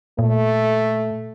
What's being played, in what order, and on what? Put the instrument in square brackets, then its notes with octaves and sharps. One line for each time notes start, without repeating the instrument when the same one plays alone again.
[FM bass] A#2 [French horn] A3